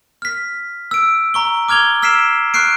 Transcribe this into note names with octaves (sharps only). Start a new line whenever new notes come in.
F6 B6
E6 D7
A#5 C#6 G7
D6 F6 G#6 F7 G7
E6 F6 B6 C7 D7 E7
C#6 F6 F#6 C7 D7